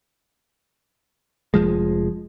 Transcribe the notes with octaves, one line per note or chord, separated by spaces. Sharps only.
F1 F2 F3 G#3